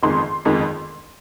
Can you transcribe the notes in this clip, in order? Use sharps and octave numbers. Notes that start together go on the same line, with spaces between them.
G1 F2 D#3 G#3 C6
G1 F2 D#3 G#3